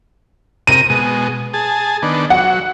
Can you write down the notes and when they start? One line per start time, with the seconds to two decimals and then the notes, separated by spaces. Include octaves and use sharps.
0.67 C3 A#4 D#7
0.90 B2 G#3
1.54 G#4 A5
2.03 D#3 B3 D4
2.30 F#3 F#5